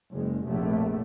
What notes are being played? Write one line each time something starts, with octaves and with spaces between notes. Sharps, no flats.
F#1 G#3
F1 A#1 A3